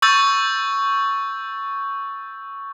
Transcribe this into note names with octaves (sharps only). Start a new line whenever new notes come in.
C#6 E6 G6 A6